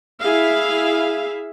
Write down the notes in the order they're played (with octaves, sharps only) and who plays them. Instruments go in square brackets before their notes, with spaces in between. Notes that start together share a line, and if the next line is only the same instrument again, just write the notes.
[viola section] E4 G#4 E5 F5